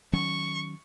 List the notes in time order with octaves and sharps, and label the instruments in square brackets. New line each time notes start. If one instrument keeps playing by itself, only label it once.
[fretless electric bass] D#3 F#3 C#4 [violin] C#6